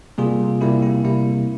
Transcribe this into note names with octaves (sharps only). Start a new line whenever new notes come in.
C3 G3 A#3 F4 G#4
C3 G3 A#3 E4 G4
E4
C3 G3 A#3 E4